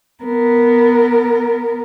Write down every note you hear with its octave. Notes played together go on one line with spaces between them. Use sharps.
B3 A#4